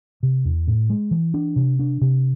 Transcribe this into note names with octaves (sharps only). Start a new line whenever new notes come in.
C3
E2
A2
G#3
E3
D4
C3
D4
C3